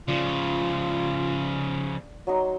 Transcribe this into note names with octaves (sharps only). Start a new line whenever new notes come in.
C#3 F3 F4 D5
F#3 D#4 C6